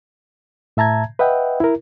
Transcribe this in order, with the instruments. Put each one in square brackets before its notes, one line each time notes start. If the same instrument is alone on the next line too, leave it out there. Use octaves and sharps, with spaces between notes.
[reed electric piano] A2 E5 A5 A#5 G#6
B4 D#5 E5 F#5 G5
E4 A#4